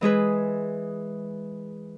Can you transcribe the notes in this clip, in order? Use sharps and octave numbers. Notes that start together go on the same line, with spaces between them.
E3 G#3 G#4 B4